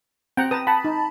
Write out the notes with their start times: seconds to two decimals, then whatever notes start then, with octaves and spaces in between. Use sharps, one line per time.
0.37 C4 F#5 G5 A#5
0.51 B4 A5 A#5 D#6
0.67 F#5 A5 B5
0.85 D#4